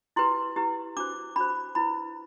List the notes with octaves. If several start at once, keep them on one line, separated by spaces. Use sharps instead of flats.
E4 G4 B4 C6
E4 G4 B4
D4 F#4 C5 D6
D4 F#4 C5 B5
E4 B4 B5